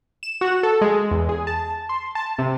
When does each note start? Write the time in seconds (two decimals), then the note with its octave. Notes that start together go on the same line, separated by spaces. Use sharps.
0.23 E7
0.41 F#4
0.63 A4
0.81 G#3
1.11 E2
1.29 G#4
1.47 A5
1.89 C6
2.15 A5
2.38 C3